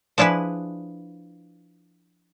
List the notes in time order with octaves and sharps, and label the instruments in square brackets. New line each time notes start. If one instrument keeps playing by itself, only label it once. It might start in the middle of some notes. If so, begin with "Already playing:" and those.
[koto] F3 D4 E4 G#4 B4